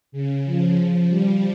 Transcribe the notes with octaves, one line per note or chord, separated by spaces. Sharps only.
C#3
F3
F3
G3